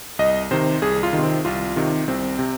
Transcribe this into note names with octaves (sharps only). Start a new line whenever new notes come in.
C2 D#5
C3 D#3 C5
C2 G#4
F4
C3 D#3
C4
C2 F4
C3 D#3
C2 C4
C3